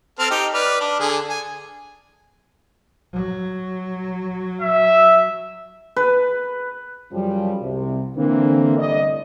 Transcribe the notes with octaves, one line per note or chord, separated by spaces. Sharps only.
C4 A4 F6
D#4 G4 G5
B4 D5 F6
D4
D3 G#4
G#5
F#3
E5
B4
F#2 C#3 F3 G3
C2 C3
D3 E3 A#3 C4
G1 C2 A2 C3 D5 D#5